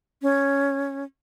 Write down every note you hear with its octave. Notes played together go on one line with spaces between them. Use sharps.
C#4